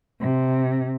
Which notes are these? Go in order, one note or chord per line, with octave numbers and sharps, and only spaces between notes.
C3